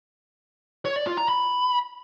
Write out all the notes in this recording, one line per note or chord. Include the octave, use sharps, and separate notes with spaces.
C#5
D5
F4
A#5
B5